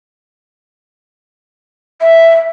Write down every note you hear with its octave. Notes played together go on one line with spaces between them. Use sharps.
E5